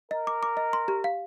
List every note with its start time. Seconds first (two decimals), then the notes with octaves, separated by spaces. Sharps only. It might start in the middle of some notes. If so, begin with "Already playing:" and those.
0.11 A#4 D#5
0.27 D6
0.43 D6
0.57 D#5
0.73 C6
0.88 G4
1.04 F5